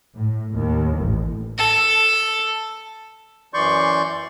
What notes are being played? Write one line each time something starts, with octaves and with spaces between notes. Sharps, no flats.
A2
D#2
A1
A4
F#2 E3 D5 C6 C#6 G6